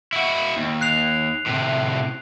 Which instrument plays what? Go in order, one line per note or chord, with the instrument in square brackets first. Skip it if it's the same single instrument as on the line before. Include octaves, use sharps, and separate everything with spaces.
[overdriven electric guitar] E4 F#4
D#2
[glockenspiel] F#6 C7 F7
[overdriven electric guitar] A2 C3